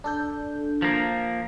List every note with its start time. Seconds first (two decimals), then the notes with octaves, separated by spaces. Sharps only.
0.04 D4 A4 G6
0.82 F3 A#3